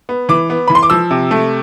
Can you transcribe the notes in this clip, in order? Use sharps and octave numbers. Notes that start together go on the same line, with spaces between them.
B3
E3 D6
B3
E3 B5
C6
D6
F3 E6
C3
A3